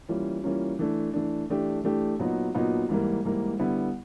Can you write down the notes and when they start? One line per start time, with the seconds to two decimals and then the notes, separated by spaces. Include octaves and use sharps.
0.09 E3 G3 A#3 C#4 F4
0.43 E3 G3 A#3 C#4 F4
0.79 E3 A3 D4
1.14 E3 A3 D4
1.49 E3 A3 D4 G4
1.84 E3 A3 D4 G4
2.19 A#2 F#3 B3 D#4 F#4
2.54 A#2 F#3 B3 D#4 F#4
2.89 G#2 E3 G3 A#3
3.25 G#2 E3 G3 A#3
3.59 D3 G3 B3 E4